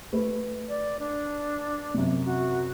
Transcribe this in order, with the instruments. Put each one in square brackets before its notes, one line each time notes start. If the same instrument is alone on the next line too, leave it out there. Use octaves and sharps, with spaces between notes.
[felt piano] A3 B4
[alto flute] D5
D4
[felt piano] F#2 C3
[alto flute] F#4